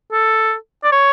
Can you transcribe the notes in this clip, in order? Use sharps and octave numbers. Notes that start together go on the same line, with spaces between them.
A4
D5
C#5